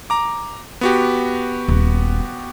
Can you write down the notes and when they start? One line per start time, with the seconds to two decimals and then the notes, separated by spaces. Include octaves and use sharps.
0.10 A#5 D6
0.81 B3 F#4 G4
1.68 D#1 E4